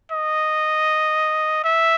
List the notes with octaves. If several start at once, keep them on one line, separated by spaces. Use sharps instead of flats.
D#5
E5